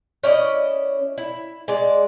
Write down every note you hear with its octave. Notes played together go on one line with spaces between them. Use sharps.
C#4 E4 D5 D#5
E4
G#3 D5